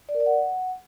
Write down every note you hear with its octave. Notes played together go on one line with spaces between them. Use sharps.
D5
A#4
D5
F#5